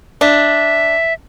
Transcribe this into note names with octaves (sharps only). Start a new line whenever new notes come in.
D4 E5